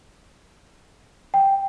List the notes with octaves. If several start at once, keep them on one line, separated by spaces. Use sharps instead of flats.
G5